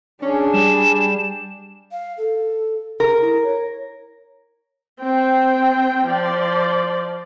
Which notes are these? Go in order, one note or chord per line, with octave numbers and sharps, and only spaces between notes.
C#4 D4 G#4
G3 E7
F5
A4
G#4 A#4
E4
C#5
C4 G5
F3 D5